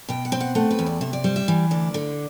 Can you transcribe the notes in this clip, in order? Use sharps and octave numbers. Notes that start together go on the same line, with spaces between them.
B2 G5
F#5
C4 G5
F#5
A3 F#5
B4
E2
D5
C3 E5
D5
G3 C5
E5
E3
D2 D5
D3